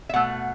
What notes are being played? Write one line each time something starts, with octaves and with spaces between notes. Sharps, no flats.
E5
B2 A3 F#5